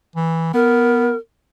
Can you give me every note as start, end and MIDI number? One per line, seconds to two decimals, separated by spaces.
0.16 0.51 52
0.54 1.13 59
0.54 1.17 70